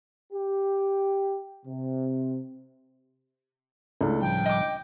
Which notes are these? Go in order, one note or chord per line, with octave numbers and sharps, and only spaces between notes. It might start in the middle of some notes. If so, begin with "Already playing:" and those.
G4
C3
C#2 A3 D4 E4 A4
A2 F3 G3 G5
D#5 D6